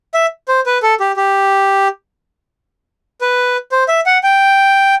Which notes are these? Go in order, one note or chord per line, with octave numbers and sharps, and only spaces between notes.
E5
C5
B4
A4
G4
G4
B4
C5
E5
F#5
G5